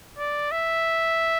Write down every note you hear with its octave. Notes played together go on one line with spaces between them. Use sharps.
D5
E5